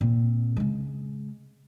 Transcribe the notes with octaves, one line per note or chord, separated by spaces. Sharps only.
A#2 C4
C#3 G#3